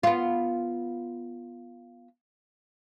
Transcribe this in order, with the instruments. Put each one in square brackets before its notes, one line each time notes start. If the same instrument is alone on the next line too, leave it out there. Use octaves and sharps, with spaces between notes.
[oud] B3 F4